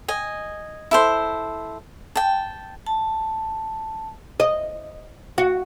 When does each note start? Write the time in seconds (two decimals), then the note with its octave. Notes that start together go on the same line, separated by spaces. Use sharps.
0.08 D#5 G#5
0.91 E4 A4 C5
2.15 G5 A5
2.86 A5
4.40 D#5
5.38 F#4